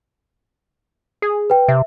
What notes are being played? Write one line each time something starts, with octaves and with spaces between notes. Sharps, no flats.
G#4
B4 G5
C3 E5